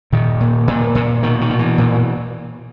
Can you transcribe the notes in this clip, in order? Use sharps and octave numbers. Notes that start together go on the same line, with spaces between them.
A#2 D#3
A#2
A#2
A#2
B2 D#3
D#3
B2
E3
A#2